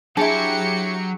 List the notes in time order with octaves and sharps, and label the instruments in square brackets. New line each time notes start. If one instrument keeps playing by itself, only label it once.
[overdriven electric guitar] F#3 C#5 [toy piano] D4 G#4 [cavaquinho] E4 A5 [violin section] G4 C#7